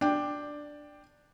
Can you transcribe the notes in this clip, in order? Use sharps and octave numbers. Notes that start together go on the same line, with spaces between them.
D4 G5